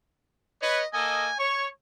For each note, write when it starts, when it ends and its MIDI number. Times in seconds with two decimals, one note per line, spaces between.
0.62 0.81 71
0.62 0.81 73
0.62 0.86 75
0.93 1.29 58
0.93 1.29 69
0.93 1.29 75
0.93 1.37 80
1.39 1.68 73
1.39 1.64 85